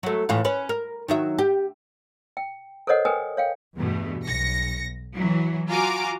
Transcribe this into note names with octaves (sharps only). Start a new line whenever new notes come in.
F#3 A3
A2 E3 F4
C#4 B4
A#4
D#3 F#3 E5
G4
G5
A4 A#4 C5 C#5 D#5 F#5
A#4 B4 G5 G#5 D#6
C#5 F5 G5
E2 G2 B2 A3
B1 A#6 C#7
E3 F#3
F4 F#4 G#5 A#5 D6